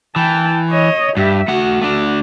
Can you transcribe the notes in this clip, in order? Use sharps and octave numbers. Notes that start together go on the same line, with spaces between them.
E3 G5 A5
C#5 D#5
G2 G4 E5
A3 F#4 F#5
A3 D4